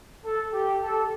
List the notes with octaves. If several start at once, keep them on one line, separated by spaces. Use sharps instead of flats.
A4
G4
A4